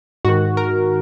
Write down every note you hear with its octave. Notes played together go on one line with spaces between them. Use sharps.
G#2 D#3 F#4
A#4